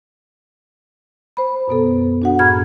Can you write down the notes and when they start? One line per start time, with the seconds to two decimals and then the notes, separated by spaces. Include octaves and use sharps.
1.37 C5 B5
1.68 F#2 B2 B3 A4
2.22 D4 F#4 F#5
2.39 F#2 A2 G#4 B5 F6 G#6